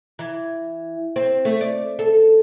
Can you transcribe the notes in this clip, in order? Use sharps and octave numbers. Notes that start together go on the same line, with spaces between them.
E3
C4
A3
D5
A4